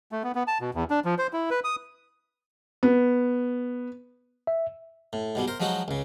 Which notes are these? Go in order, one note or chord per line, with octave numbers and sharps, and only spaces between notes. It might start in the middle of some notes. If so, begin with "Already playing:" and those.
A3
B3
B3
A5
B2
E2
D4
F3
C5
E4
B4
D#6
B3
E5
A2
G#2 B2 G3
A#4 C5
F3 F#3 G#3 D#4 F#4
C#2 C#3